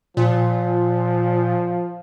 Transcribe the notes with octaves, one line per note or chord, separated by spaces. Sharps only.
A#2 F3